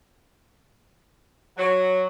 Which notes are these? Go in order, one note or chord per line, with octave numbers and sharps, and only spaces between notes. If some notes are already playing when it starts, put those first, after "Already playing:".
F#3